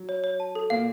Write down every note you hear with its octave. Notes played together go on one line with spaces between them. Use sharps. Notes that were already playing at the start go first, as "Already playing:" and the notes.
Already playing: F#3
C#5
C#5
A5
A4
A#2 A#3 F5